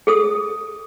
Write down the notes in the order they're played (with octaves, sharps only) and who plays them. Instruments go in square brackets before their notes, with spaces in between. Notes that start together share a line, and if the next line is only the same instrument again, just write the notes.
[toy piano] G#4 A4 D#6